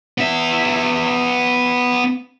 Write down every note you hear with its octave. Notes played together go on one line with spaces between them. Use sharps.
B3 E5